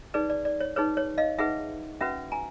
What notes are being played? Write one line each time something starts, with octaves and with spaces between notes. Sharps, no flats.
D#4 G#4 B4 D5
D5
D5
C#5
D#4 G#4 B4 C#5
C#5
D#5 F5
D#4 G#4 B4 E5 F#5
C#4 F#4 B4 E5 F#5
G#5 A#5